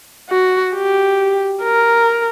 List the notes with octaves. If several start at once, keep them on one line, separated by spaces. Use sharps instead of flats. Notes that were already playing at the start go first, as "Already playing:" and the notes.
F#4
G4
A#4